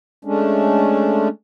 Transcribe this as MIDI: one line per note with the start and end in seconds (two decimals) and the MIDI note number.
0.25 1.28 56
0.25 1.28 57
0.25 1.28 61
0.25 1.28 62